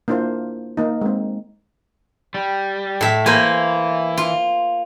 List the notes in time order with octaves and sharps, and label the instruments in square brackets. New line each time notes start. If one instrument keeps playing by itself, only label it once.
[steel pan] A#3 D4 E4 F4 C5
A#3 D#4
G#3 C4
[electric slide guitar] G3
[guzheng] A2 E5
[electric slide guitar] E3 [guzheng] A#3 C5 G#5
[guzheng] F4